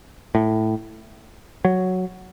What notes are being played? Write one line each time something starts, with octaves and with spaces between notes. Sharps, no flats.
A2
F#3